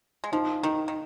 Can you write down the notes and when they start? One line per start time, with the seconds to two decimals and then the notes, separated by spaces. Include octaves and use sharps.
0.24 G#3
0.32 F3 D#4
0.63 D#3 D#4
0.88 D#3